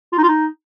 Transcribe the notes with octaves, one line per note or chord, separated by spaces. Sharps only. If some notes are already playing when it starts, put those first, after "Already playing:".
F4
D#4
F4
D#4